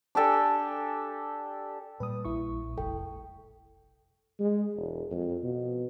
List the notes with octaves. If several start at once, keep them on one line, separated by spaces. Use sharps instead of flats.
D4 G4 A4 G#5
A#2 G3 B4 D#6
A#1 E4 C#6
F1 A4 G5
G#3
E1
F2
B2